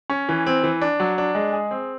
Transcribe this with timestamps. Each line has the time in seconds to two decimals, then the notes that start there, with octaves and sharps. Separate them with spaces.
0.10 C#4
0.29 E3
0.46 C4
0.64 E3
0.81 D4
1.00 F#3
1.18 D4
1.35 G#3
1.53 G#4
1.71 C4